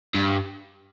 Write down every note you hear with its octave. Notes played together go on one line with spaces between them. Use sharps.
G2